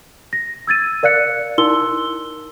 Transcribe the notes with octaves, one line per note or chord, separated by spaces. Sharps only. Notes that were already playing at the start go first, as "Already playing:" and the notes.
A#6
E6 G#6 A6 D#7
A#4 D5 F5 F#6 C#7
D#4 E4 A#4 C6 E6 G7